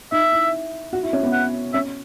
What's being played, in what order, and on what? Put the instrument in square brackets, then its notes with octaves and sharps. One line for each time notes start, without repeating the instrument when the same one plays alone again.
[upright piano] D#4 [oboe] E5
[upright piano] E4
F#4
E4
C#4
B3
[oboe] F#5
[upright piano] C#4 [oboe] E5